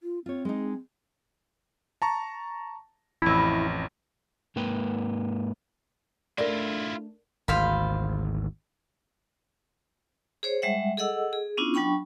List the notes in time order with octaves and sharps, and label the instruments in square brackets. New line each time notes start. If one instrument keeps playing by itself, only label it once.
[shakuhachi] F4
[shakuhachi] C4 [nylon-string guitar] F4 C#5
[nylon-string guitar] G#3 D#4
[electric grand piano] A5 A#5 C#6
[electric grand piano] A1 F2 [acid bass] E4
[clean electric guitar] G#2 A#3 A#4 B4 G5
[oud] A3 D4 [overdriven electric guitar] E4 F4 [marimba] A#4 D5
[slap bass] G#1 D2 [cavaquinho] C5 F5 B5
[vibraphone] G#4 C5 C#5
G3 G#3 E5 F#5
G#4 A4 D#5 F#5 E6
G#4
B3 C#4 D4 E4 F4
F#3 D4 G5 B5 C#6